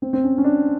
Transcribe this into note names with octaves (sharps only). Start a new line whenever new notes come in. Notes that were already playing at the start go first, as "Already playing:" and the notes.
C4
C4
C#4
C#4
D4